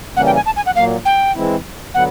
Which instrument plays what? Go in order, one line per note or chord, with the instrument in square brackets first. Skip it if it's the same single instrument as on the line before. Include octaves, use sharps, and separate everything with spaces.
[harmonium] C#3 E3 G3 A#3 C#4 [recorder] F#5
[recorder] G5
G#5
A5
G#5
F#5
[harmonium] A#2 F#3 A#3 [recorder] F5
[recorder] G5
[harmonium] E3 G#3 C4 E4
[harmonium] D3 F#3 B3 [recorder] F#5